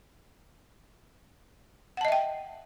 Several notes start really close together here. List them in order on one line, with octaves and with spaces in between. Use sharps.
F#5 A5 D#5 E5 G5